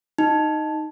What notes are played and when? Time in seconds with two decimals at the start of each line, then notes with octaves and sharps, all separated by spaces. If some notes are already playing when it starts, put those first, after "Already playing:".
0.19 D#4